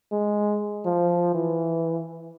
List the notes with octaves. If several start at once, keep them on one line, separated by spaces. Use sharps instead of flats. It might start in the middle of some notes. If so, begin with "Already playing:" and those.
G#3
F3
E3